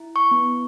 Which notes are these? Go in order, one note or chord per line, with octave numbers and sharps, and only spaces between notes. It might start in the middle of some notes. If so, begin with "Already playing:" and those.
Already playing: E4
C#6
B3